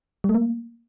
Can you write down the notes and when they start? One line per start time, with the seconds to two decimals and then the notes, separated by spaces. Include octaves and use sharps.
0.24 G3
0.29 A3
0.34 A#3